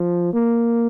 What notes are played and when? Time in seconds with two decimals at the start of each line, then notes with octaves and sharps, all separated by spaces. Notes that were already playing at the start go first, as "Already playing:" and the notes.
Already playing: F3
0.33 A#3